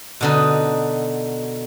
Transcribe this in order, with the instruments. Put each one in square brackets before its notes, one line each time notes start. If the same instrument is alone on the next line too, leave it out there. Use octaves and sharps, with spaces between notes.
[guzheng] B2 D3 D#4